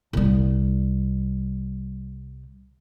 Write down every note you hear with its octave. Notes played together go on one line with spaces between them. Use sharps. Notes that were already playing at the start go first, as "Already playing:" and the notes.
C2 G3